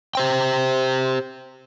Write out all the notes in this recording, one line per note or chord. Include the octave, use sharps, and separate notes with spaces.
G4 C5 G5